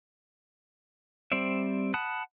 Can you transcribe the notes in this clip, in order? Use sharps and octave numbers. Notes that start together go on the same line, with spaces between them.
G3 C4 C5 D5 E5
F#5 A5 B5 D#6 F#6